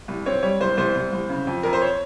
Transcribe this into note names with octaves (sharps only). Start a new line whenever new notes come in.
C2
C4 C#5
G3 C#5
C2 C5
C2 C5
C2
C2
C#3
F2
F2 A#4
C5
C#5